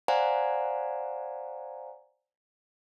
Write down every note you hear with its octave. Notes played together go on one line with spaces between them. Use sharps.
C5 D5 F5 F#5 G#5 A#5